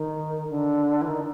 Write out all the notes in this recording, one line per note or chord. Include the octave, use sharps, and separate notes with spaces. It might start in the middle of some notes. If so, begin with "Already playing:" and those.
Already playing: D#3
D3
E3
D#3